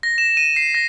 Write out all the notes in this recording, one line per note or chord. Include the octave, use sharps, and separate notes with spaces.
A#6
E7
D#7
C7
A#6